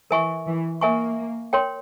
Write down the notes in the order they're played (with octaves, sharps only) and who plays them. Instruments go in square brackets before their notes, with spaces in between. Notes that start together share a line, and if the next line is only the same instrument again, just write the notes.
[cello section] E3 [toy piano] A#4 E5 G#5 C#6
[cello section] E3
[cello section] A#3 [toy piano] A#4 E5 G#5 C#6
[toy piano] A#4 C#5 G5 C6